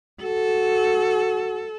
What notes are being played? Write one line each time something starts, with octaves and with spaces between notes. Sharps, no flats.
F#4 A4